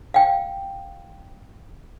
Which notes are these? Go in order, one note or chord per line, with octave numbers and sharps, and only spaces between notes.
F5 G5